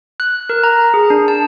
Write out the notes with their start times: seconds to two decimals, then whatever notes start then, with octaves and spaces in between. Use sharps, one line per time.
0.20 F#6
0.49 A#4
0.64 A#5
0.94 G#4
1.10 D4
1.28 A5